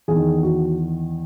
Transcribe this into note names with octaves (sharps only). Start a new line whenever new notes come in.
E2 G#4
D#3
F#4